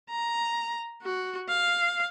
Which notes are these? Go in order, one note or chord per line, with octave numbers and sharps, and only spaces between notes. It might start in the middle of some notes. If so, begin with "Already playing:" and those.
A#5
F#4
F5